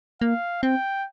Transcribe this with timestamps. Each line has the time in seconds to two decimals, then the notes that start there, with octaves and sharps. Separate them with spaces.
0.21 A#3 F5
0.63 C4 G5